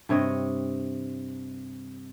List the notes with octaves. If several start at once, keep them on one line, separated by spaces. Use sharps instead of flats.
G2 C3 C#5 D#5